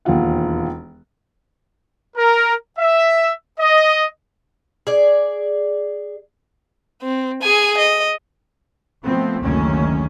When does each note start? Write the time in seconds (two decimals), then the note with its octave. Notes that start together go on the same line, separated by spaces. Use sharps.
0.05 E1 D#2 A#3 F4 F#5
2.15 A#4
2.77 E5
3.59 D#5
4.87 G#4 D5
7.02 C4
7.42 G#4 G#5
7.78 D#5
9.03 F3 A3 B3 C4
9.40 F#1 D2 D#3 C#4